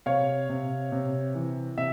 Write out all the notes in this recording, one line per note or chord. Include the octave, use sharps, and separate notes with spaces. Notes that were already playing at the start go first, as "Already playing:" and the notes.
C3 C#5 F5
C3
C3
E3
C3 E5